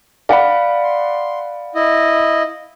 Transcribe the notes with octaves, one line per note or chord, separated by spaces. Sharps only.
D5 F5 F#5 B5
C6
E4 D#5